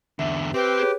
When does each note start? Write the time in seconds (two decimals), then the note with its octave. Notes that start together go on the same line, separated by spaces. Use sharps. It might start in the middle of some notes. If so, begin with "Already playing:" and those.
0.19 E2 D3 E5
0.54 C4 G4 B4
0.79 G#4 C#5